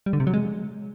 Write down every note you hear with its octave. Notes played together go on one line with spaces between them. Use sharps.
G3
D3
C3
F#3
G#3